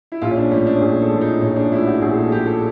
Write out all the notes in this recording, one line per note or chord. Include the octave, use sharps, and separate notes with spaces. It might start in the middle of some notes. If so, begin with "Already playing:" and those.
E4
A#1 F4
C#4
D4
A2 F3 C#4
D4
A#1 G#4
A4
A2 F3
D#4
A#1 C#4
D4
A2 F3 E4
F#4
A#1 G#4
A4
A2 F3 G4
A4